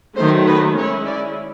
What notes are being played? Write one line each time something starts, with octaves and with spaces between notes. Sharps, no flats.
D#3 F#3 A3 C5
B4
G#3 C#4 E4 C#5
D5